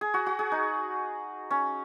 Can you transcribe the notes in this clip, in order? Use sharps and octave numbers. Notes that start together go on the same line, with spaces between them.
G#4
F#4
F#4
G#4
D#4
C#4